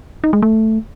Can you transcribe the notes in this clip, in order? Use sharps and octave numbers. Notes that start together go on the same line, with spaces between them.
D#4
G#3
A3